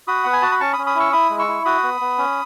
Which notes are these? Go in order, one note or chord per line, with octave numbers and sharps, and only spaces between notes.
F#4 B5 D#6
B3 F#5
G#5
F#4 A5
B5
C#4 A5 C#6
B5 D#6
C#4
B5 D#6
E4 C#6 E6
E4 B5 D#6
G#3
C#6 E6
E4
F#4 B5 D#6
B3
B3
C#4